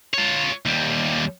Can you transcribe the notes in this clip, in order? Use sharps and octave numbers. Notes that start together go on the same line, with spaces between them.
F4 C#5
D#2 G3